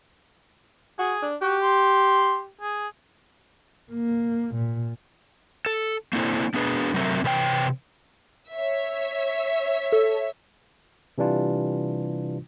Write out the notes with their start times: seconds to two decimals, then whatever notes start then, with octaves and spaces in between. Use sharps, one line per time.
0.99 F#4 G#4
1.22 D4
1.42 F#4 G4
1.62 C6
2.61 G#4
3.92 A#3
4.55 A#2
5.66 A4
6.13 A#3 C4 D4 E4 A4 C5
6.54 B3 D4 G#4 B4
6.94 C3 F#3 A3 C4 A#4 E5
7.24 C3 E3 B4 C#5 G5
8.53 C#5 E5
9.92 A4
11.18 C3 E3 G3 D4 F4